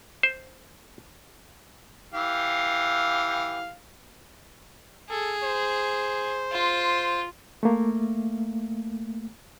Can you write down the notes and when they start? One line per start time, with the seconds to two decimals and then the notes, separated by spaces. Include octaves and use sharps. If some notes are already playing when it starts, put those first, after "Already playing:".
0.23 C5
2.14 E3 G4 F5
5.10 G#4 A4
5.43 C5
6.52 F4
7.63 A3 A#3